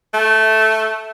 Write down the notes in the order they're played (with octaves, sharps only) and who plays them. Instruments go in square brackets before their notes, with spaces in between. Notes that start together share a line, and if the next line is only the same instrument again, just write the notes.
[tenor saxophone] A3